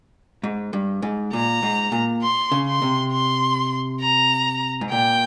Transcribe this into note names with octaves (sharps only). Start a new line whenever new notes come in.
G#2
G2
G#2
A#2 A#5
G#2
A#2
C6
C#3
C6
C3
C6
A#5
G#2
A#2 G5